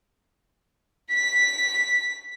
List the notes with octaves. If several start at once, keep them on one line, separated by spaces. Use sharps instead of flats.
B6